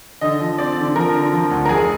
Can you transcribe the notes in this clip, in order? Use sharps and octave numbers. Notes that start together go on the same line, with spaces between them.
D3 D#5
F3
C4 D5
D3
F3 A#4
D3
F3
D2
A#4
F1 G#4